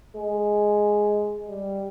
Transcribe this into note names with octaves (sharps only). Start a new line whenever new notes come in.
G#3
G3